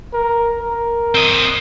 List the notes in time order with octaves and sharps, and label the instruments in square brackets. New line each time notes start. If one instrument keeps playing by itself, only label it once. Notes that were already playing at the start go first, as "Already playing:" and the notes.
[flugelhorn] A#4
A#4
[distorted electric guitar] C4 D#5